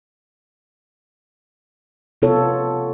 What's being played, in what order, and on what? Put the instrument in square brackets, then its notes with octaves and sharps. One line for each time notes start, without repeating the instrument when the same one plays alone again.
[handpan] C3 B3 F4 A4 C#5